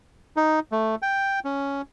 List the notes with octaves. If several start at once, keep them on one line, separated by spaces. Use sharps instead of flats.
D#4
A3
G5
C#4